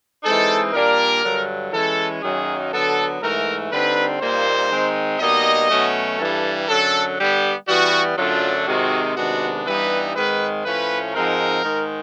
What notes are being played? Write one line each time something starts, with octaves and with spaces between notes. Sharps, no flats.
E3 G#3 C4 D#4 A4
A#2 G3 A#3 D4 A#4
G2 D3 F#3
E3 G#3 C#4 A4
F#2 D#3 F#3 A#3 D#4 G#4
D3 F#3 B3 A4
G#2 E3 A3 A#4
D3 G3 C4 D#4 B4
A#2 G3 A#3 D#4 C5
D#3 G#3 C4 D#4
B2 G3 A#3 D#4 D#5
B2 F#3 A3 C#4
G2 E3 G3 A4
F#2 D3 F#3 A4
D3 G3 B3 G4
E3 G3 B3 F#4
F#2 D3 F#3 A3 D4 F4
C3 D#3 G#3 C4 D#4 F#4
C3 D#3 G#3 B3 D4 F#4
G2 E3 G3 B3 D#4 B4
G#2 D#3 G#3 C4 B4
A2 F3 A3 C#4 B4
G#2 F3 G#3 C4 D#4 A#4
G#2 D#3 G#3